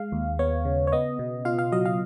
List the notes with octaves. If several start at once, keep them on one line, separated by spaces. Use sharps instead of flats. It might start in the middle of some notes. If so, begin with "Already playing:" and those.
Already playing: G#3 F5
D#2
B3 C#5
C#3
C#5
B3 D#5
B2
F4 F5
F5
F#3 D#5
F5